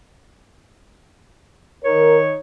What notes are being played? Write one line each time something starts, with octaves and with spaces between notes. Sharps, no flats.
D#3 D#4 A#4 C#5